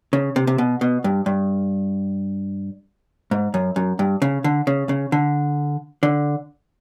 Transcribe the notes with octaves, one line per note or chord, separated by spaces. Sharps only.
C#3
C3
C3
B2
B2
G2
G2
G#2
F#2
F#2
G2
C#3
D3
C#3
C#3
D3
D3